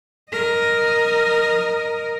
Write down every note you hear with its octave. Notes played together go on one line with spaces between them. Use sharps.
A#4 D#5